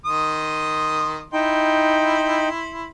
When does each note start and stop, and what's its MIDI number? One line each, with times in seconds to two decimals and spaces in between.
0.06 1.25 51
0.06 1.25 84
0.06 1.25 87
1.33 2.49 63
1.33 2.88 64
1.33 2.49 79
1.33 2.88 84